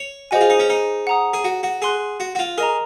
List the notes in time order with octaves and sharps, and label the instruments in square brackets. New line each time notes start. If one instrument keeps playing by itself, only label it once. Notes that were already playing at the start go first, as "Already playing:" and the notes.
Already playing: [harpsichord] C#5
[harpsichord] F#4 [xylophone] G#4 C5 D#5 G#5
[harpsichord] F4
D#4
C#4
D#4
[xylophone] F#5 A#5 D#6
[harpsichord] G#4
F#4
F#4
[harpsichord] G#4 [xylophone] F#5 C6 F#6
[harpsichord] F#4
F#4
F4
[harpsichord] G#4 [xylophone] A#4 D#5 A#5